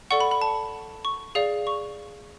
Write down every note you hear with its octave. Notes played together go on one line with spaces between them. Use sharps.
A4 D5 F#5 C#6
B5
B5
A5
C#6
G#4 D5 F5
C#6